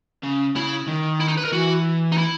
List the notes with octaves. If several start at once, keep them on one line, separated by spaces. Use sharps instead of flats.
C#3
C#3 E4
D#3
E4
D#4
B4
A#4
E3 F#4
D#4
E4